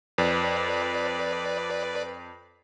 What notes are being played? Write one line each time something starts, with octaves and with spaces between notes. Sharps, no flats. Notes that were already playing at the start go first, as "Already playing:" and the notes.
F2 B4 D5